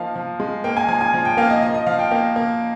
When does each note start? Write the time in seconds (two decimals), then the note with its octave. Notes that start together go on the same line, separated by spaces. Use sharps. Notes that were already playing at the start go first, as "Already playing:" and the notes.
Already playing: F3 A#3 D#4 F5
0.15 F3
0.40 G#3
0.64 A#3 G5
0.77 G#5
0.88 F3 G#5
1.01 G#5
1.14 F3
1.25 G5
1.37 A#3 F5
1.50 D#5
1.62 F3 D#5
1.74 D#5
1.87 F3 F5
1.99 G5
2.11 A#3 F5
2.36 A#3